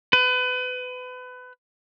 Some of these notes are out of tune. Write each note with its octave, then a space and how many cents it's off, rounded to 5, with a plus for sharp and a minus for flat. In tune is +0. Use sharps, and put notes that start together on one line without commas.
B4 +30